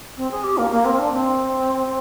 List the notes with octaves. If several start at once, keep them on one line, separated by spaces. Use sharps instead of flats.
C4
G#4
G4
A#3
A#3
C4
D4
C4